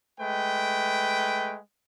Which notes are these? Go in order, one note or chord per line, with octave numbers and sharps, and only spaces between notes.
G#3 A3 B4 G5